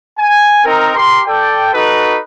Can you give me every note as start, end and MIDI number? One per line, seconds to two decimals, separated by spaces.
0.18 0.64 80
0.65 0.94 60
0.65 0.94 63
0.65 0.94 70
0.96 1.20 67
0.96 1.20 70
0.96 1.20 84
1.26 1.70 69
1.26 1.70 74
1.26 1.70 79
1.73 2.18 63
1.73 2.18 66
1.73 2.18 69
1.73 2.18 71